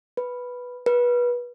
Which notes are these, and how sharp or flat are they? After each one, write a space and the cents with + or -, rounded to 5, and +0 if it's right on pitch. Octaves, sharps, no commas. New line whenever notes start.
B4 -5
B4 -25